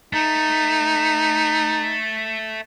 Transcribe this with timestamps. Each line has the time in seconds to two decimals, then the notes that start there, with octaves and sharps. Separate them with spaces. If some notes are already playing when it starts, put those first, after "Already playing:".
0.13 A3 D#4